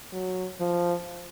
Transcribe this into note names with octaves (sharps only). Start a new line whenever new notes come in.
F#3
F3